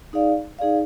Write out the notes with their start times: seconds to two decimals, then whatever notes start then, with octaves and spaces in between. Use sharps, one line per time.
0.13 D#4 G#4 D5 F5
0.59 D#4 G#4 D5 F5